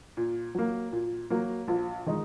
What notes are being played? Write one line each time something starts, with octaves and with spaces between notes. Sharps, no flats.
A#2
F#3 A#3
A#2
F#3 A#3
A#1
D#3 G#3 D#4